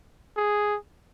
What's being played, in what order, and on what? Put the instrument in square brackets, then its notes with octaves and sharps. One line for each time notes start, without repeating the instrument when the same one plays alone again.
[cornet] G#4